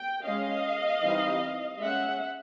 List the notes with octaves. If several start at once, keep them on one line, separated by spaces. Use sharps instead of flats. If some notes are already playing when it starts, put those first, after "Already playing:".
Already playing: G5
G#3 C#4 D#5 F5
E3 G3 C4 D#4
G#3 C#4 E5 F#5